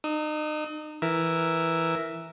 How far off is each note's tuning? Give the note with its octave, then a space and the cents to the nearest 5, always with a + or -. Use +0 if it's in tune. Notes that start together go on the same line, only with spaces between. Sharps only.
D#4 -35 D#6 +30
E3 +0 A#4 +0 E5 +0